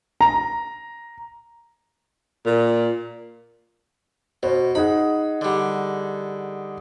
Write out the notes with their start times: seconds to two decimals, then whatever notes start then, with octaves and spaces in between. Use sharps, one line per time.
0.21 A#5
2.46 A#2
4.43 B2 C5
4.75 D#4 G#4 F#5 B5
5.41 D3 G3